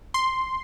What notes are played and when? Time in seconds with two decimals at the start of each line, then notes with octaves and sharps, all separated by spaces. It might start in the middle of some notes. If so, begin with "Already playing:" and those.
0.14 C6